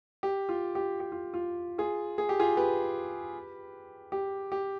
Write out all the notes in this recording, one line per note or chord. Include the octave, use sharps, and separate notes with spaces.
G4
F4
G4
G4
F4
F4
F4 G#4
G#4
G4
F4 G#4
G4 B4
G4
G4